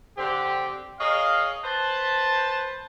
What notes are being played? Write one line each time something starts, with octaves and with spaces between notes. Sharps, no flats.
D3 C4 G4
G#4 A#4 C#5 D#5 F5
B4 C5 A5